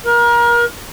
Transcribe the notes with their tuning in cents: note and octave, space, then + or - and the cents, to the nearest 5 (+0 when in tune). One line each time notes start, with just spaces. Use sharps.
A#4 +30